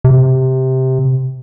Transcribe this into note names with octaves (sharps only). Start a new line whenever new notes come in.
C3